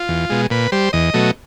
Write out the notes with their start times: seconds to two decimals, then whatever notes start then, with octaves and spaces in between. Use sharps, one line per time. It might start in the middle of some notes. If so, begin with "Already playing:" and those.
Already playing: F4
0.09 E2
0.30 B2 G#3
0.50 A#2 B4
0.72 G3 C5
0.93 E2 D#5
1.14 B2 F#3 A3